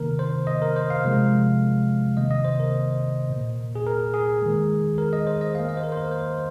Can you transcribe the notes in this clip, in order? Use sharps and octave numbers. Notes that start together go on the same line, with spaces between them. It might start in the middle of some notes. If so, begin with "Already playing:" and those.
Already playing: C3 D#3 A#3 A#4
C5
D#5
A#4
C5
F5
C3 F3 G#3
C3 D#3 A#3 D#5
D#5
C5
A#4
A#2 A#3
G#4
A#4
G#4
D#3 G#3
A#4
D#5
C5
D#5
D#3 A#3 F5
D#5
C5
A#4
C5
A#4
C5